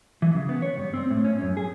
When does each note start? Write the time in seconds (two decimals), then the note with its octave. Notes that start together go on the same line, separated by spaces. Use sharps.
0.22 E3
0.35 C#3
0.49 B3
0.62 C#5
0.77 G2
0.94 C4
1.10 A2
1.24 C#4
1.41 F#2
1.57 G#4